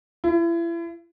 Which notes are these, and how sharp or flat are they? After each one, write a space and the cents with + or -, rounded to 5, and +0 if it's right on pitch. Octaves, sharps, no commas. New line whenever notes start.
E4 +35